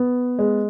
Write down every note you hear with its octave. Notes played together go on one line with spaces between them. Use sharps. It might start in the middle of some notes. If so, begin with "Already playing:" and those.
Already playing: B3
G#3